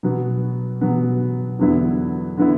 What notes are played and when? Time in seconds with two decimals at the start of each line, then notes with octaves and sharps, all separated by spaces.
0.03 B2 F#3 B3
0.81 B2 F#3 B3
1.59 E2 D3 F#3 B3 E4
2.37 D3 F#3 B3 E4